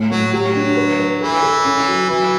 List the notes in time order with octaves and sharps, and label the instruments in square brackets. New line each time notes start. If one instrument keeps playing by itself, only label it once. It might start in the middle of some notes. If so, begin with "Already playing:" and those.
Already playing: [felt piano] A2
[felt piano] A2 [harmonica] F#3
[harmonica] F#3 [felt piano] G4
[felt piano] D4
B4
B4
[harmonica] E3 [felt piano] A4
[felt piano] A4
C#4
F#3
[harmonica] E3 [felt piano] F#3